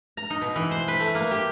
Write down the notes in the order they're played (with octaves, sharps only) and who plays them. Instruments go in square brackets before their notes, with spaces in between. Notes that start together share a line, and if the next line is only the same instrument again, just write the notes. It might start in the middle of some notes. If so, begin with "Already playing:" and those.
[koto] A#5
D#4
B2
E3
C5
B4
A3
A#3
G4